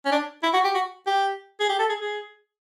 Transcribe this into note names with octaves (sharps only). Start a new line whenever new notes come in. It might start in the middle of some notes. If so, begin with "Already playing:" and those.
C#4
D4
E4
F#4
G4
F#4
G4
G#4
G4
A4
G#4
G#4